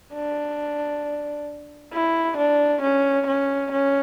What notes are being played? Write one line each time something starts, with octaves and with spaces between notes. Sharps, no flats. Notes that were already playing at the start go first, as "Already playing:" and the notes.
D4
E4
D4
C#4
C#4
C#4